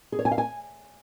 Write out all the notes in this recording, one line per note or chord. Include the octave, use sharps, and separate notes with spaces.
G#4
C#5
G#5
F5
G#5